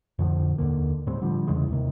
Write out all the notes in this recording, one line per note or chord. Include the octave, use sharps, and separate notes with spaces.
F2 A2 D3 F3
D#2 D3 A#3
A2 G3 C4
D3 F3 G3
E2 C#3 E3 G#3
D#2 C3 D#3